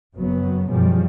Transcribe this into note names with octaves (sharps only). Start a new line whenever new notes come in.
F#1 F#2 F#3 B3
F#2 B2 D#3 F3 G3 G#3